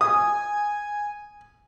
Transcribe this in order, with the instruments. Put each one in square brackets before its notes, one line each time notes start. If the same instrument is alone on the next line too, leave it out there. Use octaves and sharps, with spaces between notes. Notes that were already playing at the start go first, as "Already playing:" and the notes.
[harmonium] G#5 [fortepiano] D#6